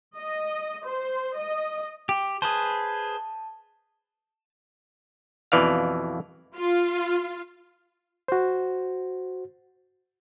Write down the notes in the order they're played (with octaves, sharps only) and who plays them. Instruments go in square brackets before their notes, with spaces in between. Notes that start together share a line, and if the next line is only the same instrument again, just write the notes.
[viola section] D#5
C5
D#5
[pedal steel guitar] G4
[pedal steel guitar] G#4 B4 C5 [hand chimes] A5
[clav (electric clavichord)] F2 B2 E3 D5 F5
[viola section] F4
[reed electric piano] F#4 C5